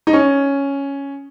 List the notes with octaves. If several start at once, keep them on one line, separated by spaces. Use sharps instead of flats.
D#4
C#4